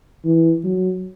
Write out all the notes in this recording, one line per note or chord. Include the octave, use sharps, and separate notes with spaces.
E3
F#3